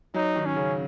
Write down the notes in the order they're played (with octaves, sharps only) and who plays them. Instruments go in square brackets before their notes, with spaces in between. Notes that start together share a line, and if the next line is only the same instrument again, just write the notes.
[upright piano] F#3 [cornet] D#4
[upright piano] D#3
[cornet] C#4
[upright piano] C#3